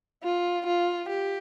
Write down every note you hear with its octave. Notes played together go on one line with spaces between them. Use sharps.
F4
F4
G4